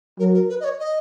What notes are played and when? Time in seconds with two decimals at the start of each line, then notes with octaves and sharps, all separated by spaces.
0.19 F#3 A#4
0.34 A#4
0.50 B4
0.60 D#5
0.64 C#5
0.79 D#5